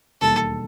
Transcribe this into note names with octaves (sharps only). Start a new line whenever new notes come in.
E1 D#2 D#3 G3 A4